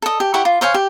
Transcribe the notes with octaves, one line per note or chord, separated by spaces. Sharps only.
A4 D#5
G4
E4 G4 F#5 C#6
F4
C5 C#5 F5 G#5
G4